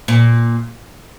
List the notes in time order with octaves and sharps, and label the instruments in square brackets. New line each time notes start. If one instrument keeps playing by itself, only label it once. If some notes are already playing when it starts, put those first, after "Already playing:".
[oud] A#2